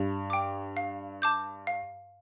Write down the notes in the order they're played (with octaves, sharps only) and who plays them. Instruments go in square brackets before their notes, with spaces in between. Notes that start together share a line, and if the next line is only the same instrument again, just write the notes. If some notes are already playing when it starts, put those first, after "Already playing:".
Already playing: [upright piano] G2
[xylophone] G5 D6
F5
A5 D6 G6
F5